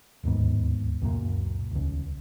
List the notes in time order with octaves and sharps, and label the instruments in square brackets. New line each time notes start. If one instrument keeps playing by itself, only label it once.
[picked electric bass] D1 D#2 G#2 B3
C#2 F#2 A#2
D#1 C#2